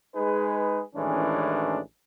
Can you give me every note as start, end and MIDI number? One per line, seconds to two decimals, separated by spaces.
0.15 0.82 56
0.15 0.82 63
0.15 0.82 68
0.15 0.82 71
0.96 1.80 33
0.96 1.80 51
0.96 1.80 52
0.96 1.80 56
0.96 1.80 61
0.96 1.80 62